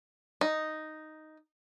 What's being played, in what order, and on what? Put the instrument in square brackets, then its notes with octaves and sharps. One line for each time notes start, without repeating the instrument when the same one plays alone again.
[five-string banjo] D#4